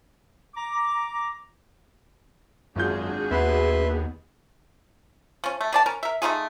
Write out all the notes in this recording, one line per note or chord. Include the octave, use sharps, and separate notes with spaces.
A#5 D6
G#1 F#2 D4 F4 F#4 G#4 G6
D#2 B3 B4 E5 C6
F3 C#4
A3
D#3 D5 A5
C#4 A#4
A#4 E5
A3 D#4 F4 G#4